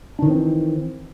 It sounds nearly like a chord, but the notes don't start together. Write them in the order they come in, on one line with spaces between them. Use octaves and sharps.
D4 D#3 E3 C4